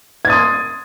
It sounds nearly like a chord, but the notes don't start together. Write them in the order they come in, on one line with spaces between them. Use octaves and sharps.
G#6 A6 D#6 C6